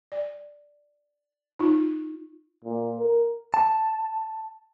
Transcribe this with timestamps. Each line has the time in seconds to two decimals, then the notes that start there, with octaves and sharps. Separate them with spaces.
0.12 D5
1.59 D#4 F4
2.64 A#2
2.99 A#4
3.54 A5